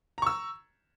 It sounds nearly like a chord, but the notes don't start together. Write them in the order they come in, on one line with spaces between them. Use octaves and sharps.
A#5 C#6 E6